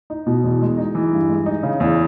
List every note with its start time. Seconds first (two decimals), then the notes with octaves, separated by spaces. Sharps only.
0.10 D#4
0.27 B2
0.44 E2
0.62 G#3
0.78 D#4
0.95 E3
1.13 G2
1.29 G#3
1.46 D#4
1.63 C#3
1.80 E2